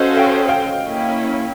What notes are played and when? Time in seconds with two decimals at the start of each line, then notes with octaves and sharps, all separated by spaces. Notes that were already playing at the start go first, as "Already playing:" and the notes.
Already playing: C#4 F#4 A4 C5 D#5 F5
0.17 F5 G5
0.49 F5 G5
0.81 A#3 C#4 E4